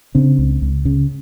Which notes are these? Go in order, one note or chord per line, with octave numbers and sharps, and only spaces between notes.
C#3 C4 D4
C#2
C#2
C#3